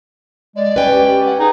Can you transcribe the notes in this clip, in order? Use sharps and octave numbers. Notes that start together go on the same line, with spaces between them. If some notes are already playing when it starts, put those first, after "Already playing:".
G#3 D5
C#4 B4 G5
G4
F#5
D#4 G#4